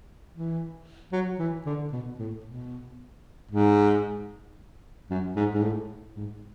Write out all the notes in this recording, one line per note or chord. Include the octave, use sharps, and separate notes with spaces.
E3
F#3
E3
D3
B2
A2
B2
G#2
F#2
G#2
G#2
A2
G#2